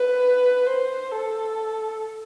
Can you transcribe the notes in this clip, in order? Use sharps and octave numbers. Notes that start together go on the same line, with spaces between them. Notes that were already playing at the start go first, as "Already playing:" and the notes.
Already playing: B4
C5
A4